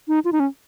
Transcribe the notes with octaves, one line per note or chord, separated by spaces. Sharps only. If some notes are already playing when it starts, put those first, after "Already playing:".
D#4
F4
D#4
C#4